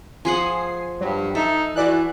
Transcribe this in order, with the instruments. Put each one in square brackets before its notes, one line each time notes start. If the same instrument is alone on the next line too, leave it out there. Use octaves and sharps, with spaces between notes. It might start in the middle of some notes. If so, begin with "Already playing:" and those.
[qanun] F3 G#4 F#5 [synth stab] G#5 C7
[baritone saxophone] G2 [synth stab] F#3
[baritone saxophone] D#4 [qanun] A4 [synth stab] E5
[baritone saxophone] E3 [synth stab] F#4 D5 F#6